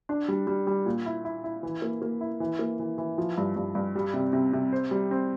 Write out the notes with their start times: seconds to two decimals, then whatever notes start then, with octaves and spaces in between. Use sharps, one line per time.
0.09 D4
0.28 G3
0.47 G3
0.67 G3
0.86 A#2
1.06 E4
1.25 E4
1.44 E4
1.63 E3
1.82 A#3
2.02 A#3
2.21 E4
2.40 E3
2.59 A#3
2.79 E3
2.98 E3
3.18 F3
3.37 G2
3.56 G2
3.75 G2
3.95 G3
4.14 C3
4.33 C3
4.53 C3
4.73 C5
4.91 G3
5.11 C4